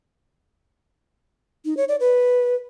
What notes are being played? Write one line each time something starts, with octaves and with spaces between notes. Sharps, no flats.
D#4
C#5
D5
B4